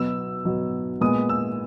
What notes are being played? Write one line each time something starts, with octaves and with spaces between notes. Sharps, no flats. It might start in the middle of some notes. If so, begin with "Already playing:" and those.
Already playing: B2 F#3 B3 E6
B2 F#3 B3
A#2 G#3 B3 D#6
E6